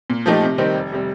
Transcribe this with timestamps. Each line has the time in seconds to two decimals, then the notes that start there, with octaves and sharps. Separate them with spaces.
0.10 A#2
0.26 F3 A3 D#4 G4
0.42 C3
0.58 D#3 G3 C4 D#4
0.74 F1
0.92 C3 G3